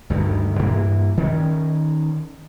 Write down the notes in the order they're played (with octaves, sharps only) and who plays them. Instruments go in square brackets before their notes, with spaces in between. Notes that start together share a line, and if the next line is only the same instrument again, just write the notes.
[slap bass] D2 G2 D3 D#3
G2 E3 A#3
D#3 C#4